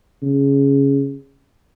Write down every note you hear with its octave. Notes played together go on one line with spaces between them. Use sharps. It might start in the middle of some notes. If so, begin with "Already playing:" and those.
C#3